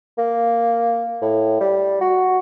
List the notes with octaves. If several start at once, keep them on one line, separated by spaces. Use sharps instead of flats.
A#3
A2
G3
F#4